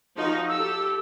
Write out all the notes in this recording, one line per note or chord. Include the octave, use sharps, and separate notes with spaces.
F3 D#4 F#4
G4 A4 E6